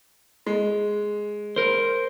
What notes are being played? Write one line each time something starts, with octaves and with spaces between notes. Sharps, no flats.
G#3
A#4 C5